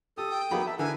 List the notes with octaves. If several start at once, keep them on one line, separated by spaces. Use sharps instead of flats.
G4 A4 D#6
G5
F#3 A#3 B3 D#4 G#4 B5
E5 A5
D3 E4 A#4 B4 G#5